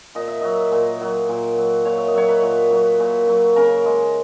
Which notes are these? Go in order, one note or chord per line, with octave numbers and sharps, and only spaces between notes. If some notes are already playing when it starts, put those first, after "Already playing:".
A#2 D#5
E5
F#3 D#5
A#2
F#3
A#2
F#3
A#2 C#5
E5
D#5
F#3 C#5
B4
A#2
F#3
A#2
F#3
C#3 A#4
G#3